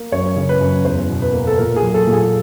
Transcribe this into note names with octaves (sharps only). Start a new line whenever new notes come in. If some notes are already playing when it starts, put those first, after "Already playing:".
Already playing: A#3
F#2 C#5
C#3
B4
F#2
E2 C5
B2
B4
A#3
A4
A#2 A#4
G#4
F#3
A4
A#2
G#4